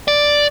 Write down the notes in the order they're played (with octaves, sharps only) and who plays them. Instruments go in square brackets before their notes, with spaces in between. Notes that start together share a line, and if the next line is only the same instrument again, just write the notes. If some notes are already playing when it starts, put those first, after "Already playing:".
[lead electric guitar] D5